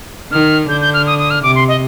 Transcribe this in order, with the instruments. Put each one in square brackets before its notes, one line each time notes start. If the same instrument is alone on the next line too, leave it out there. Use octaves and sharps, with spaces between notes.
[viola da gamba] D#3 [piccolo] F6
[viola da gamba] D3 [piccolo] G6
[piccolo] G6
F6
D#6
D#6
F6
[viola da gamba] C3 [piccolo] D6
[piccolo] C6
D#5